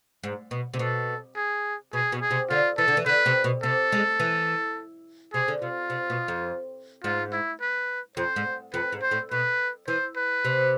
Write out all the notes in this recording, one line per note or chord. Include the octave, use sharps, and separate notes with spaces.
G#2
B2
C3
B2 A4
G#4
B2 G#4
B2
G#4
C3
D3 F4
E3 A4
D3
E3
D3 B4
C3
B2
C3 A4
G#3
E3
C3 G#4
D3
C3 F4
C3
B2
F2
G#2 F4
E4
B4
F2 C5
G#2
F2 B4
G#2
C5
A2
B2 B4
E3 C5
B4
C3